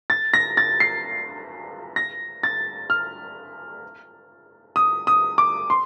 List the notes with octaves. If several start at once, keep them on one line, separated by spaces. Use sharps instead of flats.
A6
A#6
A6
C7
A#6
A6
F6
D#6
D#6
D6
C6